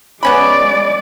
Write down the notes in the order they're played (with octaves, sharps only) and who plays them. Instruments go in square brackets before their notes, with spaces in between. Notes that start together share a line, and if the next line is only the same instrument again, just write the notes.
[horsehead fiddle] G#3 D5 [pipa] B3 C#4 B5